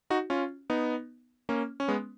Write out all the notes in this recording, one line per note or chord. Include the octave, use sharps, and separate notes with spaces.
D#4 F#4
C#4 F4
B3 D#4
A#3 C#4
C#4
G#3 B3